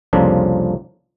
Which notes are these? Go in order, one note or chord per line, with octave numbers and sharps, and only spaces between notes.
C2 F2 C#3 F3 A#3 D4